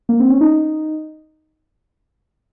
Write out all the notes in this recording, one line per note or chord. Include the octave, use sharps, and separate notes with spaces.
A#3
C4
C#4
D#4